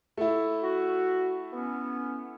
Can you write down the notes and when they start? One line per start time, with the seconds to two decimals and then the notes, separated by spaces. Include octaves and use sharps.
0.17 A3 E4
0.61 F#4
1.52 B3 C#4